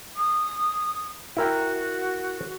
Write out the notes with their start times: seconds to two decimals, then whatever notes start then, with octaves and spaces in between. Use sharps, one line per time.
0.16 D#6
1.37 E4 F#4 A#4 G5